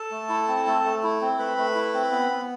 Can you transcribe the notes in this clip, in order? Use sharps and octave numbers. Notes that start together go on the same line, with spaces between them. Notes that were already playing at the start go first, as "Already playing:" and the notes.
Already playing: A4 A5
A3
E4
C4
A3
A3
E4
C4
A3 B4 B5
A3
E4
C4
B3
B3